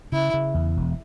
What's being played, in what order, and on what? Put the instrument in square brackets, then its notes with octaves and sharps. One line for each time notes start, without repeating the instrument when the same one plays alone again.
[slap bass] C#3 [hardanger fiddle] E4
[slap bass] C#3
E2
E1